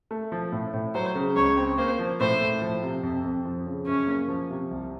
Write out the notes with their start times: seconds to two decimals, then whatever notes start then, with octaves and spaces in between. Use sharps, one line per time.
0.11 A3
0.32 F3
0.52 A2
0.73 A2
0.95 F#3 C5
1.15 C#3
1.36 C#2 C#5
1.57 C4
1.78 A#3 C5
1.99 F3
2.20 A2 C5
2.41 A2
2.62 F3
2.83 C3
3.03 F2
3.24 F2
3.45 F3
3.66 C#3
3.86 F#2 C#4
4.07 A#3
4.28 F3
4.50 C3
4.71 C2